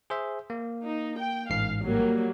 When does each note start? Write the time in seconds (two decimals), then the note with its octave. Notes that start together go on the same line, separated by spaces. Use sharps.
0.10 G#4 C5 E5
0.50 A#3
0.84 D#4
1.19 G5
1.50 A1 G#2 F5 C7
1.83 F#3 G3 A#3